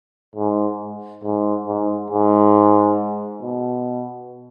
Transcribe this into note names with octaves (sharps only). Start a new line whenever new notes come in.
G#2
G#2
G#2
G#2
B2